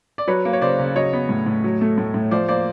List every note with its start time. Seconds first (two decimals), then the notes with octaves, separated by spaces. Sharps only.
0.18 D5
0.28 F#3 B4 C#5
0.45 A#3
0.53 C#5
0.62 C#3 C5 D5
0.79 C#3
0.96 F#3 C#5 D#5
1.13 B3
1.29 A2
1.46 A2
1.64 F#3
1.81 A3
1.98 A2
2.14 A2
2.31 F3 C5 D5
2.48 A#3 C5 D5